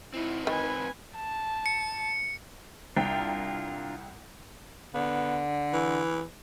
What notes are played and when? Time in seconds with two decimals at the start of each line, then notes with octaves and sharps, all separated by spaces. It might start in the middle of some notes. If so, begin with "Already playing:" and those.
0.14 C4 D#4 E4
0.47 D#3 B4 G#5
1.16 A5
1.66 C#7
2.97 C2 D4 F4 A#4 G5
4.94 D3 B3
5.73 E3